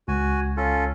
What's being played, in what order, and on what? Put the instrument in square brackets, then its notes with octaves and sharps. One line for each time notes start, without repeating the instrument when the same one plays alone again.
[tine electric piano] C#2 [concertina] F#4 G#5
[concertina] C#4 F4 A4